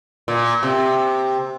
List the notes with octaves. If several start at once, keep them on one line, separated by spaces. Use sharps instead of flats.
A#2
C3